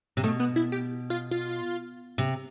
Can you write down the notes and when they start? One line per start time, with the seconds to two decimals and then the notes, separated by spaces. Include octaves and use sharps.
0.17 C3
0.23 B2 A3
0.40 B3
0.56 E4
0.72 G4
1.10 F4
1.31 F4
2.18 C3